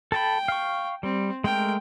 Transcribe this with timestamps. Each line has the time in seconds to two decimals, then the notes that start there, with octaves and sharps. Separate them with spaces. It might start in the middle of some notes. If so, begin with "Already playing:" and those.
0.12 A4 G5 A5 B5
0.48 F5 C#6
1.03 G3 C4
1.44 G#3 A3 A#4 G5